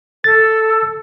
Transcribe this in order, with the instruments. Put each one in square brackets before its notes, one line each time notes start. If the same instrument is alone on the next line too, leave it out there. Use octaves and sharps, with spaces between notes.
[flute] A4 [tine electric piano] A6